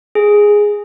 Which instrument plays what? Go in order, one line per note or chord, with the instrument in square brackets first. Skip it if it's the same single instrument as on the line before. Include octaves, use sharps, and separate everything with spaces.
[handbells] G#4